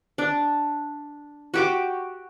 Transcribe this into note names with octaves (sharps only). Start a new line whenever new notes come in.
D4
F#4 G4 D6